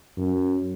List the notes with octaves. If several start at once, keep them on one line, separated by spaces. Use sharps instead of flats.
F#2